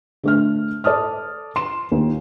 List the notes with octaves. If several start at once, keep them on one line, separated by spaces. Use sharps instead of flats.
D3 A3 F6
A4 D5 A5 D#6 F6
C6 E7
D#2